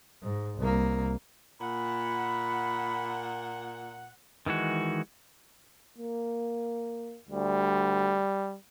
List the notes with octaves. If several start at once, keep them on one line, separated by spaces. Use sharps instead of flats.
G#2
C2 A#3
A#2 F#5 B5
D#3 E3 G#3 F#4
A#3
D2 G3